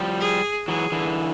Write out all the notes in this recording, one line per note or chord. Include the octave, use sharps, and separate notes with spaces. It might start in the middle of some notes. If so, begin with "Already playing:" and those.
Already playing: F3 G3
G#4
E3 F#3 G#4
D3 E3